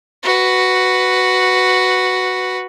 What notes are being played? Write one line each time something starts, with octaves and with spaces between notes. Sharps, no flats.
F#4 B4